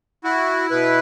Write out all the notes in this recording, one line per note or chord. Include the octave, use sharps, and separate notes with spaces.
E4 F#4
B2 B4